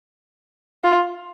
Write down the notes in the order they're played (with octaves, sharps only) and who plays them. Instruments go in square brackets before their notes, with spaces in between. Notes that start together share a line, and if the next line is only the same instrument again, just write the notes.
[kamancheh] F4